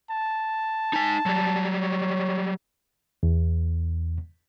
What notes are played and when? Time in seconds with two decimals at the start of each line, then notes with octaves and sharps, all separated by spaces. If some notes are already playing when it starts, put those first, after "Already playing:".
0.10 A5
0.93 D#4 G#5
1.26 F#3 G3
1.82 C#5
3.23 E2